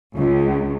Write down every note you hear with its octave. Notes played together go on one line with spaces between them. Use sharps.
C#2